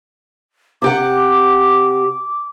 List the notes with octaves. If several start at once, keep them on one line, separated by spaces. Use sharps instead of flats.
C3 G4 F#5 D6